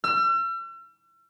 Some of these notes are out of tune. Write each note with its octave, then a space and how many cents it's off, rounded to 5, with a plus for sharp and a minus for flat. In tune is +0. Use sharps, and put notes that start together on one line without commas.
E6 +45